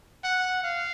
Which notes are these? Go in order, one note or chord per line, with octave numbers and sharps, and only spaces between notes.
F#5
F5